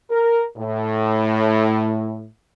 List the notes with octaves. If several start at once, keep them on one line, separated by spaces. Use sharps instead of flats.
A#4
A2